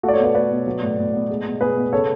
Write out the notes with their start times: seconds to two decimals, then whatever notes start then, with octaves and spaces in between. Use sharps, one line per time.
0.03 A3 F#4 A4
0.08 D5
0.13 A4 C#5
0.18 B2
0.24 B4 D5
0.35 A3 B4 D5
0.51 B2
0.67 F#3
0.82 A2
0.98 A2
1.13 B3
1.30 G#3
1.45 B2
1.61 B2 G#4 B4
1.77 B3
1.92 C#3 A4 C#5